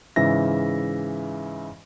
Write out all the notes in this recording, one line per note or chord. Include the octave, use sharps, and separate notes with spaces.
G#2 C#3 E3 E5 A#6